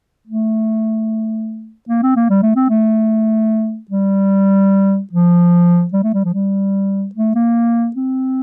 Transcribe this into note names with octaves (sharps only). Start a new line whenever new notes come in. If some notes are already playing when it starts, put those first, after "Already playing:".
A3
A#3
C4
A#3
G3
A3
C4
A3
G3
F3
G3
A3
G3
F3
G3
A3
A#3
C4